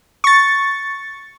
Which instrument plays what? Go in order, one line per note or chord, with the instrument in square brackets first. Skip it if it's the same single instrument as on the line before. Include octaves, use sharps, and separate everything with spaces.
[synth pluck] C#6 A6